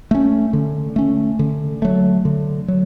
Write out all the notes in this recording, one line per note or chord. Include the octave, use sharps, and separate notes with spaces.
A3 C#4
D3
A3 C#4
D3
F#3 A3
D3
F#3